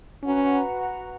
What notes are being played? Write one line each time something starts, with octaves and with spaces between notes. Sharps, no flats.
C#4 F#4 B4 F#5 A#5